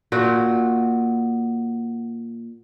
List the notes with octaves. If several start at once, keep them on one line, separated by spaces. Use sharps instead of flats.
A#2 F#4